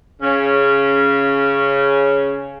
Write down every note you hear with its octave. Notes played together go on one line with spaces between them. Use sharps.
C#3 C#4